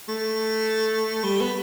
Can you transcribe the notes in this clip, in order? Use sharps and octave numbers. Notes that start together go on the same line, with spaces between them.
A3
G3
B3